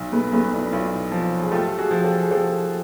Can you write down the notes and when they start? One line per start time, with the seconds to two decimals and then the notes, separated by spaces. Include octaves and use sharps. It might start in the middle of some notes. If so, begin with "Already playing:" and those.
Already playing: B1
0.12 A3 B3
0.32 B1 A3 B3
0.53 D4 E4
0.63 E4
0.72 B1 D#4 F4
1.12 F3
1.40 G#4
1.52 A3 F4 G4
1.78 F#4 G#4
1.91 F3
2.04 G4 A4
2.22 G#4
2.31 F3 G4 A4